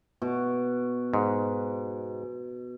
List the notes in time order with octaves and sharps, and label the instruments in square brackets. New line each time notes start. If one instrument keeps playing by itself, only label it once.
[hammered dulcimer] B2
[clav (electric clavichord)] G#2